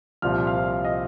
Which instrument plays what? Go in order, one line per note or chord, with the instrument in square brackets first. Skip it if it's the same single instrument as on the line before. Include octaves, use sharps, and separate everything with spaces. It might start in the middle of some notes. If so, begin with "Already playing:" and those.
[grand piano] C2 A#2 F3 F6
F5 F6
D#5 D#6